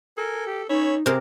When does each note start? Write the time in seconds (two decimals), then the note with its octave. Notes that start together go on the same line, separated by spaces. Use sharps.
0.18 A4 A#4 G#5
0.47 G4
0.69 C#4 D#4 C#5 B5 E6
1.06 C3 G4 G#4 A#4 C5